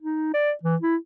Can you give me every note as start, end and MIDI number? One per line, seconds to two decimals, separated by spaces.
0.02 0.29 63
0.34 0.52 74
0.63 0.76 52
0.82 0.96 64